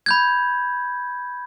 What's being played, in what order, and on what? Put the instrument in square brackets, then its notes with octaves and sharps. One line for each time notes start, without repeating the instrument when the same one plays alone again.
[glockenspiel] B5 G6 G#6